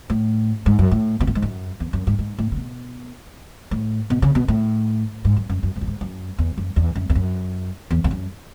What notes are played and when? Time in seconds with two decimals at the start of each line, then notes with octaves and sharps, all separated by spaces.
0.10 A2
0.66 G#2
0.79 F#2
0.91 A2
1.20 B2
1.27 A2
1.35 G#2
1.42 F#2
1.80 E2
1.93 F#2
2.07 G#2
2.19 G#2
2.38 A2
2.52 C#3
2.57 B2
3.71 A2
4.10 B2
4.22 C#3
4.35 B2
4.48 A2
5.25 G#2
5.37 F#2
5.50 F#2
5.63 F#2
5.76 G#2
5.81 F#2
5.87 G#2
6.01 F#2
6.39 E2
6.58 F#2
6.76 E2
6.95 F#2
7.10 E2
7.15 F#2
7.91 E2
8.04 E2
8.11 F#2